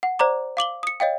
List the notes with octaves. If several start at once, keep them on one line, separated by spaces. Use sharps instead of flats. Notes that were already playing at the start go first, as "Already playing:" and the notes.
F#5
C5 D5 A#5 D6
F5 D6 F#7 G7
D#6 C#7
C#5 D#5 F5 G5